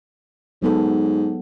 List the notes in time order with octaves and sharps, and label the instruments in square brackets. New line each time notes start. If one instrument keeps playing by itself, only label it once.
[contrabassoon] G#2 [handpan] F#3 B3 A4